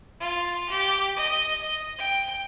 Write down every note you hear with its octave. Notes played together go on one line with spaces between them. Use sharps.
F4
G4
D#5
G5